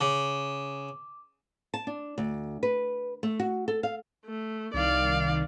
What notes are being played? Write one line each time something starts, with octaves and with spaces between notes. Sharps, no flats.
C#3 D6
A5
D4
D2
B4
A3
F#4
A4
F5
A3
C2 D#3 D5 F5